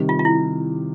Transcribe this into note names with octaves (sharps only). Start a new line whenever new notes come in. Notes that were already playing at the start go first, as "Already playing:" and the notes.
Already playing: C3 D#3 G3
F4
F4
E4